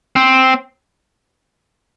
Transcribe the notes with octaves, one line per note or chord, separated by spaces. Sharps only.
C4